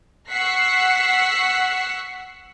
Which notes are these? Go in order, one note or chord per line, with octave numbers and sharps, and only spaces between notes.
F#5 C#6 E6 F#6 B6 C7